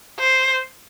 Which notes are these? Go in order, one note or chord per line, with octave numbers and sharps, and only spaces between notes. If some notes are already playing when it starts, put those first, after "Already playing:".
C5